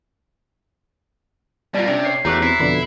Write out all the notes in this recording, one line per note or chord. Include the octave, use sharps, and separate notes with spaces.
B2 G3 A#3 F4 D5
C3 C#4 D4
C#5 C7
E2 A3 D#4 F#4 G4 A#5 D6 F#6
C4 E4 C7
F2 B2 D3 B5